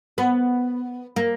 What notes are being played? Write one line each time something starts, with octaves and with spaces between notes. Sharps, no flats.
B3
A#3